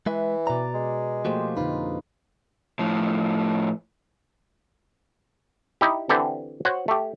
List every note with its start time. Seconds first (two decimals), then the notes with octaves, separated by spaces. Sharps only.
0.06 E3 G#3 B4 E5
0.47 B2 B4 D5 A#5
0.74 G#3
1.25 F3 A3 A#3 F#4 G4 C5
1.57 F2 D3 D#4 F4 B4
2.79 A2 F3
5.81 D#4 E4 G4
6.09 D3 E3 C4 G4 A4
6.65 F#4 C5 C#5 F#5
6.88 A3 G4